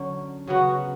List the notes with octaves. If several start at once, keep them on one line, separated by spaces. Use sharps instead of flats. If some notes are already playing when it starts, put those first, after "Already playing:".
Already playing: D3 F#3 C#4
C#3 F#3 B3 F#4